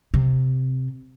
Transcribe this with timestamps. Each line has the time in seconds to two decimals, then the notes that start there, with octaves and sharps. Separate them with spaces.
0.14 C3